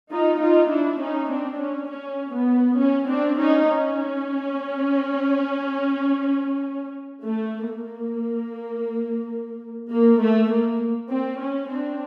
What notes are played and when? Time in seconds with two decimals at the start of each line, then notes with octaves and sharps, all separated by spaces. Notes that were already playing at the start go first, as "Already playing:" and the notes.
0.11 D#4 F4
0.40 D#4 F4
0.70 D4 E4
1.00 C#4 D#4
1.30 C4 D4
1.60 C#4
1.89 C#4
2.34 B3
2.78 C#4
3.08 C4 D4
3.38 C#4 D#4
3.68 C#4
7.24 A3
7.69 A#3
9.91 A#3
10.21 A3
10.50 A#3
11.10 C4
11.39 C#4
11.69 C4 D4